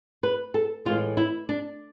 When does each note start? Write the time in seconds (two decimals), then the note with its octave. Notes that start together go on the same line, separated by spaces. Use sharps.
0.23 B4
0.54 A4
0.85 A2 E3 G#3 F4
1.17 E4
1.49 D4